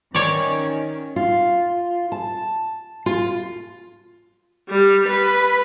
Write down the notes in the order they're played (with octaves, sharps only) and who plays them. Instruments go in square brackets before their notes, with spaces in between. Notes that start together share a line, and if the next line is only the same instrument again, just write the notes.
[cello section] D#3 C#4 [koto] C#5 D5
[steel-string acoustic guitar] F4
A5
F4
[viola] G3
B4